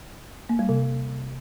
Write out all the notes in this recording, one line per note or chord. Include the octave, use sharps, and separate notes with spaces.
A#3
G3
C3